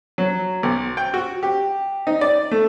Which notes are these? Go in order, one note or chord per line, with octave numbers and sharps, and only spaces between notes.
F#3
B1
G5
F#4
G4
D#4
D5
A3